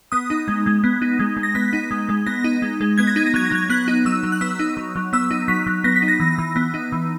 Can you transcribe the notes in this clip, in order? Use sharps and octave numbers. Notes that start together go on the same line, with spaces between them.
B3 D#6
D#4
G#3
G#3
B3
D#4
G#3
G#3
A#6
B3 B6
D#4
G#3
G#3
B3 A#6
D#4
G#3
G#3
B3 G#6
A#6
D#4 G#6
A#6
F#3 G#6
A#6
F#3 G#6
B3 F#6
D#4
F#3 E6
F#3
F#6
B3 E6
D#4
F#3
F#3
B3 E6
D#4
F#3 B6
F#3
B3 A#6
B6
D#4
A#6
E3
E3
B3
D#4
E3